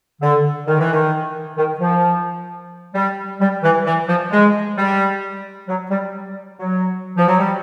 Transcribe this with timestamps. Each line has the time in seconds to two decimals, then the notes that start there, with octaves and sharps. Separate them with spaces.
0.21 D3
0.67 D#3
0.80 E3
0.93 D#3
1.57 D#3
1.80 F3
2.94 G3
3.40 G3
3.63 E3
3.86 E3
4.08 F3
4.31 G#3
4.77 G3
5.68 F#3
5.91 G3
6.59 F#3
7.17 F3
7.28 F#3
7.39 G3